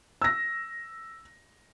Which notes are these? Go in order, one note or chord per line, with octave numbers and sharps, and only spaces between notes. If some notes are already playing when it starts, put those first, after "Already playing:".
E6 A#6